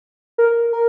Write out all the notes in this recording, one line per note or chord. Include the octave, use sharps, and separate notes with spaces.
A#4
A#4